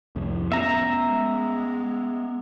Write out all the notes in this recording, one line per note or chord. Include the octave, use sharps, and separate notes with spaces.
C2 F2 A2
B3 C#4 E5 A#5
G#3